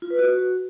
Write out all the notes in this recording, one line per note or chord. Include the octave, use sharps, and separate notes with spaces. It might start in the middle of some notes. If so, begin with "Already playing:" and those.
F4
B4
F#4